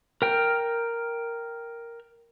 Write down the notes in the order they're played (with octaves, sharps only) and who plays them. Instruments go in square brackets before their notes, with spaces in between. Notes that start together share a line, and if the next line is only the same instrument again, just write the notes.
[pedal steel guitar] A#4 G5 F6